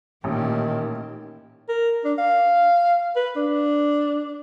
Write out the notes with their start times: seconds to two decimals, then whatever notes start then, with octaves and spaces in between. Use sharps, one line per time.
0.24 A1 A#2 D#3 G4
1.69 A#4
2.05 D4
2.18 F5
3.16 B4
3.36 D4